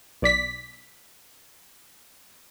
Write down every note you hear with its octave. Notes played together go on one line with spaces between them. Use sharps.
B1 D5 B6